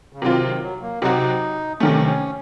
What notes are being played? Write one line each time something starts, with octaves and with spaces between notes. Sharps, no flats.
C#3
C3 D#3 F#3 C4 F4
D#3
F#3
A#3
C3 F#3 C4 D#4 F#4
C3 D#3 A3 C#4
C#4